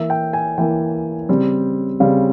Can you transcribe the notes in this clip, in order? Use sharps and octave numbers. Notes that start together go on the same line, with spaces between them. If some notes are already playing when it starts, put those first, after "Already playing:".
Already playing: E3 A#3 E5
G5
G#5
E3 A#3 G5
C#3 G3 C4
C#3 G3 C4 F5